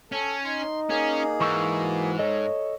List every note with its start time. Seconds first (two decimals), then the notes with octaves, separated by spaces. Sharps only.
0.12 C#4 A4
0.45 D#4 C6
0.90 A#3 C#4 G#4
1.40 G#2 E3 C#6 E6
1.79 F#4
2.19 A4 C#5 D#5